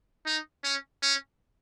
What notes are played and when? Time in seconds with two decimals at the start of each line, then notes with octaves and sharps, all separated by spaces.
0.26 D#4
0.64 C#4
1.03 C#4